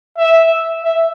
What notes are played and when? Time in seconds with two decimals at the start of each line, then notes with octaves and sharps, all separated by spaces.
0.18 E5
0.84 E5